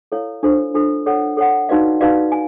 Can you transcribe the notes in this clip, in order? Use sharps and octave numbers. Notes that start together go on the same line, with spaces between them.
E4 A4 C#5 F5
D4 F4 A4 C5
D4 F4 A4 C5
A4 C#5 F#5
A4 C#5 F#5
D#4 F#4 B4 D5 F5
D#4 F#4 B4 D5 F5
G#5